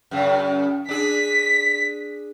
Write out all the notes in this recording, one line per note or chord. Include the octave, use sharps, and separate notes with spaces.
F#2 C#3
D4 G#4 B6